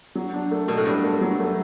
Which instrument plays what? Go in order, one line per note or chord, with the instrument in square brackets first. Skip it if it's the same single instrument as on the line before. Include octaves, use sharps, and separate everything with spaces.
[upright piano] F#3
D4
A3
[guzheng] B2 [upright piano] A3
[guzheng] A2
[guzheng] G2 [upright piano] D4
[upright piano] A3
F#3
A3